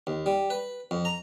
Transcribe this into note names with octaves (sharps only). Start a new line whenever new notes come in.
D#2
G3
B4
F2
A#5